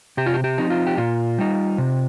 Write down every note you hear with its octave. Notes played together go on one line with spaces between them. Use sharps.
C3 G4
F4
G4
G4
F3 C4 D#4
F4
G4
A#2 F4
G3 D#4
C3